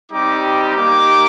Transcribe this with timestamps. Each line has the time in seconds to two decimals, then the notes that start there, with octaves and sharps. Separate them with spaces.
0.11 G3 C4 D#4 G4 D6
0.75 A#3 D#4 G4 D6